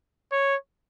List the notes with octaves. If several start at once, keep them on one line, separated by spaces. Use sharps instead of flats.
C#5